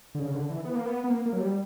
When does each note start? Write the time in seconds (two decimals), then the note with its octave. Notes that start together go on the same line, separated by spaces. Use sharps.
0.15 D3
0.20 C#3
0.35 D3
0.50 E3
0.65 B3
0.75 A#3
0.86 B3
1.04 B3
1.10 A#3
1.26 A#3
1.33 F#3
1.41 G3